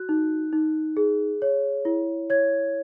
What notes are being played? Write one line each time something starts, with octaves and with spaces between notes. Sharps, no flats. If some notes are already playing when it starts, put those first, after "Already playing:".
Already playing: F#4 F#6
D#4
D#4
G#4
C#5
E4
C#5 G#6